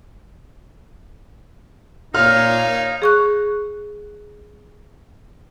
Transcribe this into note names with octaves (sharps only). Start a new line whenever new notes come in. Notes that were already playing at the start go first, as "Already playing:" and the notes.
A#2 D#4 C#5 F5 F6
G#4 C#6 F#6